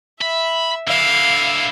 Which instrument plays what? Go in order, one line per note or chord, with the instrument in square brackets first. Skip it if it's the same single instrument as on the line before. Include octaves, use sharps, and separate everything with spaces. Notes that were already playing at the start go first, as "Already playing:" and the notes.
[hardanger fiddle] E5 [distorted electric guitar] B5
[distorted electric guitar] D3 E4 [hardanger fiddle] F5